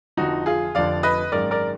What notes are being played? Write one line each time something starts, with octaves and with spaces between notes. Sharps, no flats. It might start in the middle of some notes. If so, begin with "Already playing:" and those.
F1 F2 D3 F3 D#4 F#4
F4 G#4
F1 F2 D3 F3 D5 F5
B4 D#5
G#1 F#2 D#3 G#3 A#4 D5
A#4 D5